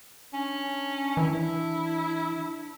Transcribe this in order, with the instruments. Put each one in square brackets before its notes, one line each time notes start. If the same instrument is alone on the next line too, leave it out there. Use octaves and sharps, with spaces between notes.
[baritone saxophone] C#4 [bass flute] D4
[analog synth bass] E3 [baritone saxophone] E4